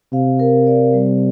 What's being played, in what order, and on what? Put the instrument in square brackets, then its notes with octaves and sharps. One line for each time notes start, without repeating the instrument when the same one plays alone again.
[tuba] C3 [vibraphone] F5
[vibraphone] A#4
D5
G3